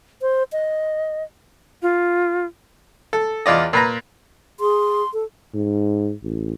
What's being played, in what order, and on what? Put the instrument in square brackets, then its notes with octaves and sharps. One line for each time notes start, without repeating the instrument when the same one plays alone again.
[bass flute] C5
D#5
[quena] F4
[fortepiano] A4
E2 F4 D5 D#5
A#2 B4 A#5
[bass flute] G#4 [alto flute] C6
[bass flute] A4
[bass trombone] G#2
A1